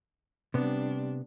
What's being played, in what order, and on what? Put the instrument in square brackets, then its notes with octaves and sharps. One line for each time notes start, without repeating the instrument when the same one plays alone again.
[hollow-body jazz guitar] C3 B3 [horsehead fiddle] G3 D4